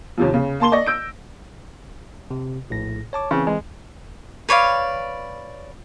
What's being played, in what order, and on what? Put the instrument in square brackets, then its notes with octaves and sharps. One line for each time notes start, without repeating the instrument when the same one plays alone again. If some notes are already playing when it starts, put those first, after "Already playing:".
[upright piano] D#2 C3 F3
C#3
A#3 A5 C6 G7
D5 D#5 C#6 A#6
E6 G6 D7
[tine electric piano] C3
A#1 A2 A#6
C#5 A5 D6
[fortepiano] C#3 [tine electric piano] E3 C4
[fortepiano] G#3
[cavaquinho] B4 C#5 D5 F5